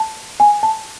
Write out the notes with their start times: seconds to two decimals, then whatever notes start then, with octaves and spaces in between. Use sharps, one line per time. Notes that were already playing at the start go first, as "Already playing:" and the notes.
Already playing: A5
0.40 G#5
0.63 A5